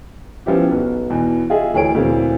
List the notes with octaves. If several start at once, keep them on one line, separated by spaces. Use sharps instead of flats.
F3 B3 C#4 E4 G4
B1 B3
E2 B2
F4 G#4 D#5 E5
D2 E3 G#4 A#4 C#5 D7
D2 A#2 E3 A#3 C4